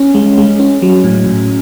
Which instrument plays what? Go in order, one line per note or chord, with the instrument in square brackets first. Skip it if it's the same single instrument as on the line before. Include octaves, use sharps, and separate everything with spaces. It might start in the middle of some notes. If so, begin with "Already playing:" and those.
Already playing: [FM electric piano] C#4
G#3
G#3
C#4
F#3
A2
A2